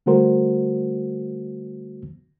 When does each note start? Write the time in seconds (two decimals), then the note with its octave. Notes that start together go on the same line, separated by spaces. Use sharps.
0.06 D3 G3 A3 F#4 A#4 C5